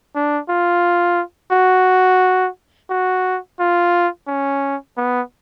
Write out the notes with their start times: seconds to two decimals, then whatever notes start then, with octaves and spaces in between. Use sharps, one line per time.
0.15 D4
0.49 F4
1.52 F#4
2.90 F#4
3.60 F4
4.28 C#4
4.97 B3